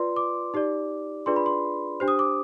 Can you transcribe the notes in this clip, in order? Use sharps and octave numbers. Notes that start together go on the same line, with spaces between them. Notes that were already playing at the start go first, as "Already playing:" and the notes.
Already playing: F4 B4 D5 C6
D6
D#4 G4 D5
D4 F4 G#4 B4 D5 C6
B5
C6
D4 G4 C5
D#6
D6